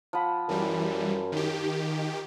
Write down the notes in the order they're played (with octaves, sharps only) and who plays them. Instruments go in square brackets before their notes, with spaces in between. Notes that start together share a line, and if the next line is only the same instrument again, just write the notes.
[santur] F3 F#5 B5
[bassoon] F#2 [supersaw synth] E3 G3
[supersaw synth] D#3 G4